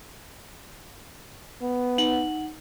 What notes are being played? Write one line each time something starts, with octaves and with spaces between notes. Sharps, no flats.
B3
D#4 F#5 F#7